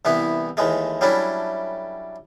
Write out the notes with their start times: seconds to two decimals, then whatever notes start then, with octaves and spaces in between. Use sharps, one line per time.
0.05 C2 E3 B3 E4
0.57 D#2 E3 G#3 A3
1.01 F#3 G3 A3 C#4 D4 E4